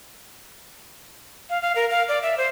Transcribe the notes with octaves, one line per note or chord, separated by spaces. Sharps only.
F5
F5
A#4
F5
D5
E5
C5